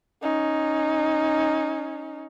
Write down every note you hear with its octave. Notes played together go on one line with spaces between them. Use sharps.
C#4 D#4